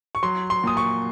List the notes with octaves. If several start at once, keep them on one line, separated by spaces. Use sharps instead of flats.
C#6
F#3 C6
C6
A#2 D#6
C#6